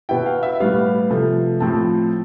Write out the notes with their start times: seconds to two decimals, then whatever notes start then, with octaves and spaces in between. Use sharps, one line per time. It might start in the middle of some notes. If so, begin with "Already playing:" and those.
0.09 B2 B3 E4 G5
0.26 F5
0.43 E5
0.60 A2 G3 B3 F5
1.10 C3 F3 A3
1.60 A2 F3 C4 A5